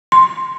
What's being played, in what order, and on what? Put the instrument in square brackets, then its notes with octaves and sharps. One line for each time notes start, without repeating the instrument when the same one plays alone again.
[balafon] C6